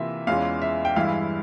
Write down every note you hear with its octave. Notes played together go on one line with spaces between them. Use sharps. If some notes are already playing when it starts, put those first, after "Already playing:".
Already playing: C3 E3 A#3 F4 E5
E2 E3 G#3 C#4 F4 F5
E5
G5
G2 E3 G#3 E4 F5